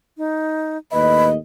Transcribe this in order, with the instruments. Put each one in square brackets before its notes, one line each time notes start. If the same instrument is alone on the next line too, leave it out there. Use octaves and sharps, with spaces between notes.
[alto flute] D#4
[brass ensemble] D#2 A2 D#5 [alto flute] B4 [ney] B5